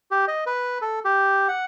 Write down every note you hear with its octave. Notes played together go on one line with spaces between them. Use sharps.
G4
D#5
B4
A4
G4
F#5